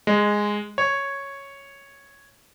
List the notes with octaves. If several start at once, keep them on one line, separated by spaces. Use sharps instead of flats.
G#3
C#5